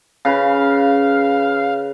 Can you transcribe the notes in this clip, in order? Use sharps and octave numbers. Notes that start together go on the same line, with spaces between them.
C#3 B4 F5